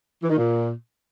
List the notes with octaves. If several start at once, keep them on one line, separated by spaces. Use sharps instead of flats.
E3
D#3
A#2